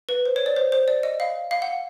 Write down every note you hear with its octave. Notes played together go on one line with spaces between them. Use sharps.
B4
C5
C#5
D5
C5
C5
D5
D#5
F5
F5
F#5